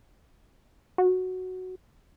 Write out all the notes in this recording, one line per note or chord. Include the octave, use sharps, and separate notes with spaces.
F#4